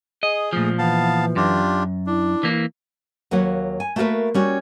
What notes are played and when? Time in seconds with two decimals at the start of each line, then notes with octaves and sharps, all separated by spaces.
0.23 G#4 D#5
0.53 A#2 F3 A3
0.79 E3 B3 F5 A5
1.36 F#2 D4 F4 G4
2.07 D4 E4
2.43 E3 A#3
3.31 D#2 F#3 A#3 B4 F#5
3.80 G#5
3.96 A3 A#3 F#4 G4 A#4 B4
4.34 G3 C#4 F#4